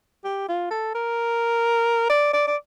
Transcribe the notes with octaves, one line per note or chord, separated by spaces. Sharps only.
G4
F4
A4
A#4
D5
D5
D5